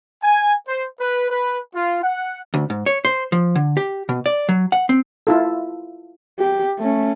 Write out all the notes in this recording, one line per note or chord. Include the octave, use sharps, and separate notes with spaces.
G#5
C5
B4
B4
F4
F#5
D2
G#2
C#5
C5
F3
D3
G4
B2
D5
F#3
F#5
C4
E4 F4 A4
G4
A3 C#4